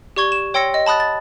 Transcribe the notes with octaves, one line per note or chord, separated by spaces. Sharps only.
G4 D5 C#6 G#6 G7
E7
C#5 G5 C6 E6 A#6 C#7
D#5
A5 B5 D#6 F#6 A6
A6